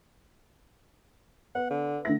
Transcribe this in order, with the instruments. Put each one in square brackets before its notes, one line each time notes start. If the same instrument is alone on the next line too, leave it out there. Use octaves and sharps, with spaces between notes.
[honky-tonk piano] B3 [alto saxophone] F#5
[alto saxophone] D3
[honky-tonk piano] D3 A3 A#6 [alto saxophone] E4